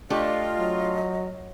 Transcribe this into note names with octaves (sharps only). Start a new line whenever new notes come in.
A3 D4 F4 G4 D#5
F#3